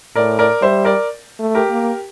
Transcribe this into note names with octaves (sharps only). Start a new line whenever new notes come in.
A2 A#4 D5
A#4 D5
G3 C5 E5
A#4 D5
A3
G4 A#4
A#3